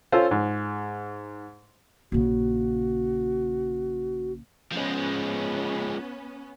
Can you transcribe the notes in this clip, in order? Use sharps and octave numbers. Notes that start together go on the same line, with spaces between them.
C#4 F4 A4 C5
G#2
A#1 C#3 F#4
F3 G#3 B3 C#4